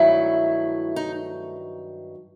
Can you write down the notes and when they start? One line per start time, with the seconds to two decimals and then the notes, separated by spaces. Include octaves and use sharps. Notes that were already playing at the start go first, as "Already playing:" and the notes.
Already playing: G2 D#3 F#3 A3 E4
0.96 D#4